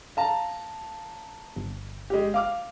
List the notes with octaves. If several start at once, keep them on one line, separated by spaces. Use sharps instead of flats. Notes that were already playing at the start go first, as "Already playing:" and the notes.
F5 A5 A#5
G1
G#3 G4
F5 D6 F6